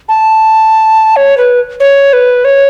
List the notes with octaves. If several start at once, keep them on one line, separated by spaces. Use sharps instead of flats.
A5
C#5
B4
C#5
B4
C#5